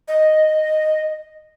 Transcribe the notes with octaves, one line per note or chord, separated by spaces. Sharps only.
D#5